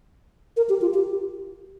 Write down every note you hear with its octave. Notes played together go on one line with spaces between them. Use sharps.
A#4
G4
F4
G4